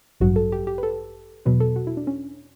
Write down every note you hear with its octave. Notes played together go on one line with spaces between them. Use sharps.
A1 G2 F#3 F#4
A4
G4
G4
B4
A4
E2 B2 F#3 B4
A4
F#4
E4
D4
C#4